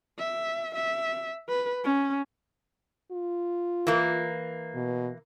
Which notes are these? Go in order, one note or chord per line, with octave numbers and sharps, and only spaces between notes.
E5
E5
B4
C#4
F4
E3 A#3
B2